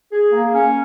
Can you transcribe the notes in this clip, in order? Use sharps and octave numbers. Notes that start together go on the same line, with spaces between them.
G#4
A#3
C#4